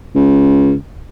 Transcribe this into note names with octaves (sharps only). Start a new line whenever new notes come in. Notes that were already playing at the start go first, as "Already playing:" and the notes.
C#2